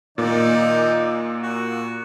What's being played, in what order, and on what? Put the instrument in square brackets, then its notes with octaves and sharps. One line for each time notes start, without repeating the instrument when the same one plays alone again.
[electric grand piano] A#2 A#3 [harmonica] D#3 D#4 D5
[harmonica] F#4